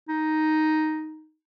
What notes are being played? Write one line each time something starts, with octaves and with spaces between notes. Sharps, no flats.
D#4